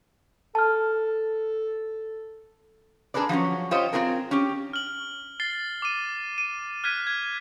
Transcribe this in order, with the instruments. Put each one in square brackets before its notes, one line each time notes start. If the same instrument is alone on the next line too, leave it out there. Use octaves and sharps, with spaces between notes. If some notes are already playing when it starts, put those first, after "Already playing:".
[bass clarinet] A4 [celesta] A5 F6
[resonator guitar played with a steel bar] D4 G#4 A#4 B4 D5
F3 F#3 C4 C#4
F4 G4 C5 C#5 D#5
C4 C#4 F4 G#4 A#4
C#4 G4
[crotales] F6 F#7
A6 C7 G7
D6 D#7
D#7
F6 F#6 G#6 B6 D#7
G#6